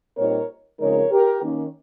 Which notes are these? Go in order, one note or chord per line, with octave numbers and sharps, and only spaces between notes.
A#2 G3 C4 D#4 A#4 C#5
C#3 F3 G#3 C4 D#4 A#4 C#5
G4 A#4
D#3 A#3 C#4